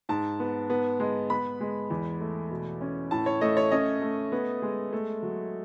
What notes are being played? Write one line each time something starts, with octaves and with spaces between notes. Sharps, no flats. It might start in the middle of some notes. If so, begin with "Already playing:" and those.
G#2 A5
B3
B3
G#3
B3 B5
G#3
E2
A3
B2
C#4
A2 A5
C#5
A3 D#5
C#5
C#4 D#5
A3
B3
G#3
A3
F#3